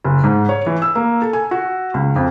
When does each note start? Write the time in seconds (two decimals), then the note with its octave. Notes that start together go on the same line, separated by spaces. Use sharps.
0.04 F#1
0.24 G#2
0.49 C#5
0.66 E3
0.82 E6
0.95 A#3
1.22 A4
1.33 G#5
1.51 F#4
1.94 C#2
2.16 F2